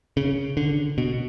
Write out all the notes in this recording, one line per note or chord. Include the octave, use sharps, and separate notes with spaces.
C#3
D3
B2